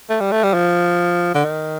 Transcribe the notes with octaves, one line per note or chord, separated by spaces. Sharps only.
A3
G3
A3
G3
F3
D3
D#3